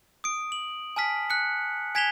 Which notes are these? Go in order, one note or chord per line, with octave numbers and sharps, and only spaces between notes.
D#6 D7
F#7
G#5 A5 F6 B6
F#6 C#7
G#5 G#6 B6 E7 F7 G7